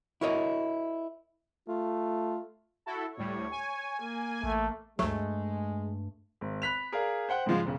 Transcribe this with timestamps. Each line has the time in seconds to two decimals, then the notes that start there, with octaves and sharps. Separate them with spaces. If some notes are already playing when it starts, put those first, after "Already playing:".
0.21 E4 F#4 A#4 C#5 D#5
1.68 A3 F4
2.86 E4 F#4 A4
3.17 D2 A2 G3 C#5
3.51 G#5
4.02 A#3
4.43 A1 A3
4.99 D2 G2 F#3 G#3 A3
6.41 G#1
6.62 B5 F#6 B6 F7
6.92 G#4 A#4 D5 F5
7.29 C5 F#5 G5 F#6
7.46 G#2 C#3 F3 G#3
7.65 E1 C#3